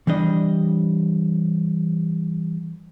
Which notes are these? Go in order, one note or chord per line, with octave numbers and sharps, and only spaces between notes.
E3 G3 D4 D#5